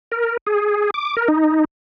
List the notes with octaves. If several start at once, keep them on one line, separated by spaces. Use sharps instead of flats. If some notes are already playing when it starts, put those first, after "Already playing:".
A#4
G#4
D6
A#4
D#4